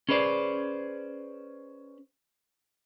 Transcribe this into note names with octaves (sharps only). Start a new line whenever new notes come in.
C#4 G#4 B4 C5 D5